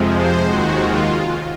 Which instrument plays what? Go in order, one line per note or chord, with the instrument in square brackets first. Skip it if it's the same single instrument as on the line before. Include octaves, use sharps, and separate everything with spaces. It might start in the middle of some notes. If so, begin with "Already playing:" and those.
Already playing: [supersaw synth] F2 C3 F3 G#3
C5
D#2 D#3 G#3 F#4
F4